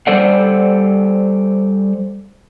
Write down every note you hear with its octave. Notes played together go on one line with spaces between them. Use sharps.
G3 A4 C5 D5 F#5